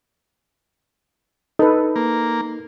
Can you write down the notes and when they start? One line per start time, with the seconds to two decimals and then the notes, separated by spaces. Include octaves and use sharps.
1.59 D#4 A4 B4
1.96 A#3